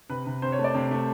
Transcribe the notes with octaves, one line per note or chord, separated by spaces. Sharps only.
C3 B4
C3
C3 C5
C#5
A3
D5
C3
A3